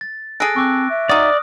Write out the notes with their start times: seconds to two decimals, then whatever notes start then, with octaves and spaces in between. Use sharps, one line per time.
0.01 A6
0.40 G#4 A4 F#6 A#6 D7
0.56 C4 C#6 D6 F#6
0.90 E5
1.09 D#4 F#4 D5 D#6 F6